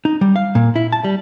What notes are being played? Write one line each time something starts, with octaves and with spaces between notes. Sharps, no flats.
D#4
G3
F5
A#2
E4
A5
G3